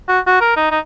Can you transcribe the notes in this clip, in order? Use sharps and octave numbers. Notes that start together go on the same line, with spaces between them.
F#4
F#4
A#4
D#4
D#4